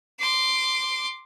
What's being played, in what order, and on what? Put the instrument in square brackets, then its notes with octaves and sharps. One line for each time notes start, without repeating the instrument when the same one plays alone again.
[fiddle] C6 D6